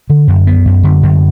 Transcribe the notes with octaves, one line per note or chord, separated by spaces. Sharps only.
D3
F#2
B3
F#2
D3
F#2